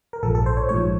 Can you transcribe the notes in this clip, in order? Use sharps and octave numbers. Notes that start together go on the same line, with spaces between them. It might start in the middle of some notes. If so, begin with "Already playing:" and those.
A#4
A#1 G#2 F3 A4
A4
C5
C#5
A#1 G#2 F3 C#5